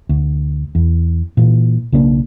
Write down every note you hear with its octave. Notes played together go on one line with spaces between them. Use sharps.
D2
E2
A#2 E3
B1 C#3 A#3 D4